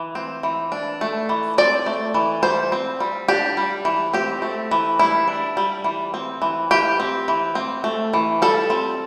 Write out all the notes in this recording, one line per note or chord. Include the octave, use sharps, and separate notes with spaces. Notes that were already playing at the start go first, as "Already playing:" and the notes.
Already playing: E3
C4
E3
D4
A3
E3
C4 D5
A3
E3
G3 C5
C4
G3
D4 G4
G3
E3
C4 G4
A3
E3
G3 E4
D4
G3
E3
C4
E3
E3 G4
C4
E3
C4
A3
E3
G3 A4
C4